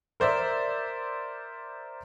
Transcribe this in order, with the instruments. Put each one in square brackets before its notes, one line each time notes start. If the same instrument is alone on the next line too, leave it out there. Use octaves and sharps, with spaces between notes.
[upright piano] A#4 C5 D5 E5